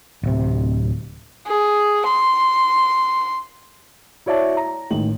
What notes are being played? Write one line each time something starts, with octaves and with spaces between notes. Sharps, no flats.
D1 C3
G#4
C6
E4 F#4 C#5 D5 E5 A5
A#5
A1 D#3 F#7